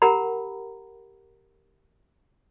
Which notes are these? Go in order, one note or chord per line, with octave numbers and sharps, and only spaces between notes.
G4 A#4 F#5 A#5 B5